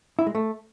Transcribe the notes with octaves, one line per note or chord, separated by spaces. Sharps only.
E4
G#3
A3